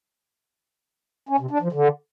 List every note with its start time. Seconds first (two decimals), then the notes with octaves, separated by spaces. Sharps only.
1.29 C#4
1.40 C3
1.51 D4
1.62 F3
1.73 D3